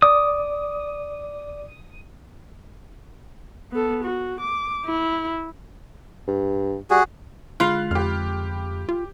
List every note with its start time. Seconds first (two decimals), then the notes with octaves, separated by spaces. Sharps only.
0.02 D5 D6 D#6
3.72 B3 A4
4.04 F#4
4.41 D6
4.85 E4
6.28 G2
6.90 G3 F#4 G#4
7.60 D3 G#3 F4 B5 F#6 C7 F7
7.91 F2 G4 F6
8.89 F4